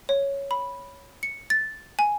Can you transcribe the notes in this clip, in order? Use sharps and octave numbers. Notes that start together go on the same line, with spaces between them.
C#5
B5
C#7
A6
G#5